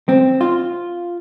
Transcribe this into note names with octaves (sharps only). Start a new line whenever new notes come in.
C4
F4